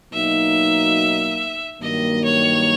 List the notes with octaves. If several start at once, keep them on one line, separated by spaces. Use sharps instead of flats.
B2 F#3 A#3 D#4 E5
G2 D#3 F#3 A#3 D#5
C#5